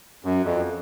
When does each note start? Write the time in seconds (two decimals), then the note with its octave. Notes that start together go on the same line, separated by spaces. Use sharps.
0.24 F#2
0.45 F2